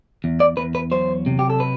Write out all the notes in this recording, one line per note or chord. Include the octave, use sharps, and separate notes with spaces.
E2
D5
E2 B4
B4
F#3 C5
C3
G4
A4
B4